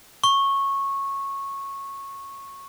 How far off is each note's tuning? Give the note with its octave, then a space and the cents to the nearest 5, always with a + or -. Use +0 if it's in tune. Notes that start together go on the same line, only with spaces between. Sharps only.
C#6 -15